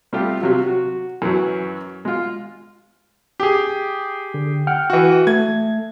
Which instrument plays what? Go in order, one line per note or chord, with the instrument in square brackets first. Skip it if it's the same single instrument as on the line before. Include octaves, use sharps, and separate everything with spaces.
[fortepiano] G3 A3 C4 F4 G4
C3 F#3 F4
F#4
F#2 E3 F#3
G#3 F4
[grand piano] G4 G#4
[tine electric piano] D3
F#5 G5 F6
[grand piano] E3 F#4
[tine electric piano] A3 [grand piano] G#6